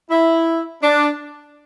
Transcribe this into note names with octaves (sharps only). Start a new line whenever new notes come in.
E4
D4